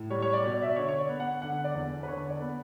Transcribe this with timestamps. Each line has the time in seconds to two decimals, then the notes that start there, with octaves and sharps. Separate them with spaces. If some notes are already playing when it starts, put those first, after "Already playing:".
Already playing: A2
0.10 G3 C#5
0.22 C#5
0.33 D5
0.43 B2
0.54 D5
0.62 E5
0.69 D5
0.76 D3 C#5
0.88 C#5
0.99 D5
1.09 B3
1.20 F#5
1.42 D3 F#5
1.64 D5
1.75 E2
2.03 B4
2.08 D3 C#5
2.30 D5
2.40 B3